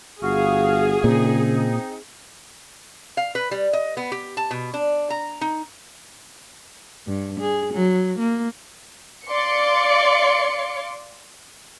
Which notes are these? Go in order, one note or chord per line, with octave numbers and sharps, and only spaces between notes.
G1 F#4 G#4 F5
A#2 C#3 C4 D#4
F5
B4
G3
D#5
B3
G4
A5
B2
D4
A#5
D#4
G2
G#4
F#3
A#3
D5 F5 C6 D6 C#7